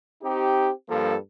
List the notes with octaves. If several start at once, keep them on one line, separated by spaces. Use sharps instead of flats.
C4 D#4 G4
G2 F3 A#3 A4